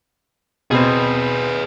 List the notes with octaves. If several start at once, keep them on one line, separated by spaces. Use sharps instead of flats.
B2 C4 G#4 B4